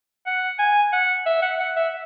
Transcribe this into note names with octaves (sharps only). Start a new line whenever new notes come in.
F#5
G#5
F#5
E5
F#5
F#5
E5